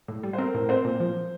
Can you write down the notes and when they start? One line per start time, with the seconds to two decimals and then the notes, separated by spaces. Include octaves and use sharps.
0.08 A2
0.23 G3
0.33 C5
0.38 C4 A#4
0.54 A2
0.69 C4 C5
0.85 A#2
1.00 F3